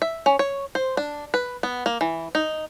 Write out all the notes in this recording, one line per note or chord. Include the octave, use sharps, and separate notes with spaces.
E5
C#4
C#5
C5
D4
B4
B3
A#3
E3
D#4